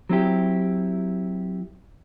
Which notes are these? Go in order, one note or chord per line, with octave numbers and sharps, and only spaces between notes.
F#3 C4 E4 G4